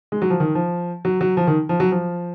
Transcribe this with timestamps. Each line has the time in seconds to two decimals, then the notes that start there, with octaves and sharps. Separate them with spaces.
0.12 G#3
0.22 F#3
0.30 F3
0.40 D#3
0.55 F3
1.05 F#3
1.21 F#3
1.37 F3
1.47 D#3
1.69 F3
1.80 F#3
1.92 F3